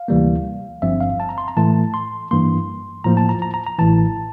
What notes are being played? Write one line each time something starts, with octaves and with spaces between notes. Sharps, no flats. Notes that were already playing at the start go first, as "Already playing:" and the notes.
Already playing: F5
D2 C3 E3 G3 A#3
G1 G2 F3 C4 E5
F5
A5
A#5
C6
A#5
A2 E3 A3 A5
C6
G2 E3 A#3 C6
A2 F3 A#3 A#5
A5
A#5
A#5
A#5
A#5
A1 A2 E3 A5